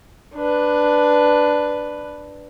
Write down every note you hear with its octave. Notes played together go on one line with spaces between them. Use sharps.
D4 B4